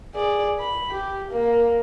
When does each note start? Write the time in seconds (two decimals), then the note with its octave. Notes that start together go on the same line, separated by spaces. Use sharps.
0.15 G#4 D5
0.60 B5
0.91 G4
1.32 A#3